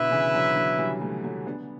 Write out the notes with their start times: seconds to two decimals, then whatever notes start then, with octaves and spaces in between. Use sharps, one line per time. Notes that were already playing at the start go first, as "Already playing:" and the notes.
Already playing: B2 D3 E4 B4 E5
0.11 C#3 E3
0.34 D3 F#3
0.56 D3 F#3
0.78 E3 G3
1.01 F#3 A3
1.24 F#3 A3
1.47 B3 D4